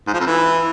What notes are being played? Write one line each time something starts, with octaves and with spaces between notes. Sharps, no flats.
G#2
F3
F2
E3